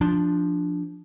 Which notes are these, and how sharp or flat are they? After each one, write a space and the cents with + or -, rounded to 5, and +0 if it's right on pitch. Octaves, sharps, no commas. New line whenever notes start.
F3 +0 D4 +0